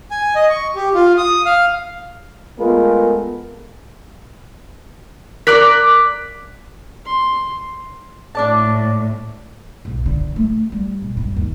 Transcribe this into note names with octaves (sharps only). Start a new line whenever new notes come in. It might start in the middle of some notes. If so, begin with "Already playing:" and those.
G#5
D#5
C#6
G4
F4
D#6
F5
G#3 A3 B3 F4 G#4 A#4
A#4 D5 D6 F#6 B6
C6
A2 D4 D5 A5
B1
D3
A3
G3
B2
G2
D#2